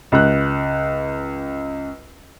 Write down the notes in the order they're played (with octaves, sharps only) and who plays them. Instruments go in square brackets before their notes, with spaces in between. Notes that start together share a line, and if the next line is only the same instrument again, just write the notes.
[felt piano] C#2 F#6